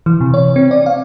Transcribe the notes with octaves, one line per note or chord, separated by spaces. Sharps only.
E3
C3
C#5
C4
D5
F5